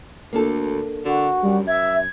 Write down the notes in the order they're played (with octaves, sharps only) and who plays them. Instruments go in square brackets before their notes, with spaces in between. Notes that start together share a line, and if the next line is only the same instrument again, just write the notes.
[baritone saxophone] D2 [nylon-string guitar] A#3 D4 A4
[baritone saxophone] D3 [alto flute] F#4
[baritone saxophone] F#2 [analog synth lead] G3
[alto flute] E5 [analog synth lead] G#6